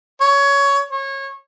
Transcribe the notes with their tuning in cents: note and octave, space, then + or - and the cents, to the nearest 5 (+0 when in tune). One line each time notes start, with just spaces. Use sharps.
C#5 +15
C#5 -25